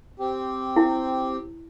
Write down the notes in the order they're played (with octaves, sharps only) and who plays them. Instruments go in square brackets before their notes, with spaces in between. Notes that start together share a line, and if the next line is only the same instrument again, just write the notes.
[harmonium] C4 G4
[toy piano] E4